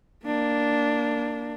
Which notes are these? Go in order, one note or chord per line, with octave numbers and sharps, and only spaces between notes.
A#3 D4